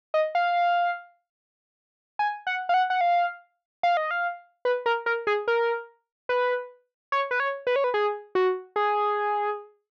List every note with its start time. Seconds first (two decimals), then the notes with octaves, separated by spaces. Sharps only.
0.14 D#5
0.35 F5
2.19 G#5
2.47 F#5
2.69 F5
2.74 F#5
2.90 F#5
3.01 F5
3.83 F5
3.97 D#5
4.11 F5
4.65 B4
4.86 A#4
5.06 A#4
5.27 G#4
5.48 A#4
6.29 B4
7.12 C#5
7.31 B4
7.40 C#5
7.67 B4
7.76 C#5
7.84 B4
7.94 G#4
8.35 F#4
8.76 G#4